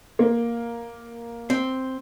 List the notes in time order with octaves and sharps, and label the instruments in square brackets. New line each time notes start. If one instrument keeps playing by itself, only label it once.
[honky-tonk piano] A#3
[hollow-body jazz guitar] C4